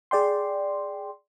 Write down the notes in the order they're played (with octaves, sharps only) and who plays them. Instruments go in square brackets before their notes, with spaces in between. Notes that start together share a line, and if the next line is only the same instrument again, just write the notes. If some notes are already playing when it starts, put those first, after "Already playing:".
[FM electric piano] G#4 D5 G5 C6